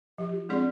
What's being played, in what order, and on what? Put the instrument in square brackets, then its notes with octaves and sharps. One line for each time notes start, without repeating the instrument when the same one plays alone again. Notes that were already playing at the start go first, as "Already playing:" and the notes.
[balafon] F3 [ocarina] G4
[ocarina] F4
[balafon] G#3 D4 G#4 D5 [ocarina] C4